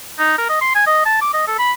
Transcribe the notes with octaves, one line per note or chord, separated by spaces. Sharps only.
D#4
A#4
D#5
C6
G#5
D#5
A5
D6
D#5
A4
B5